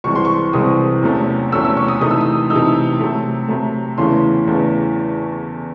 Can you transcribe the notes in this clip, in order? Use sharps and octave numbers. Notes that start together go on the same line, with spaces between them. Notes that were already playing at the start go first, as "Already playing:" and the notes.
C2 C3 E3 G#3 C4 C#6
C6
C#6
C2 C3 E3 G#3 C4 D#6
E2 C3 F#3 A3 C#4
E2 C3 F#3 A3 C#4 E6
E6
C#6
D#6
C3 E3 A3 D#4 D#6
E6
D#6
C3 E3 A3 D#4 E6
C3 F#3 A3
C3 F#3 A3
E2 C#3 E3 A3 C#4 C6
E2 C#3 E3 A3 C#4